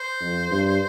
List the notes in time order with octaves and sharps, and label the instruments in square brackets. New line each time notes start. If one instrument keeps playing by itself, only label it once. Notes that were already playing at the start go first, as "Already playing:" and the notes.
Already playing: [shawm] C5
[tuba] F2
G2